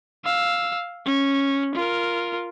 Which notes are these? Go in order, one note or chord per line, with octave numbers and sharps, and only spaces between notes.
F5 E6
C#4
F4 A#4